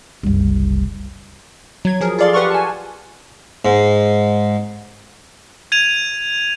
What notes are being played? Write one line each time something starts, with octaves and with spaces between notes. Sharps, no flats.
F#1 C2
F#3 G#6
F3 G#4 A#4
F4 G#4 A4 D5 F5 C6
G4 B4 F#5 C6 C#6 F6
G#5 A5
G#2
G#6 D#7 F7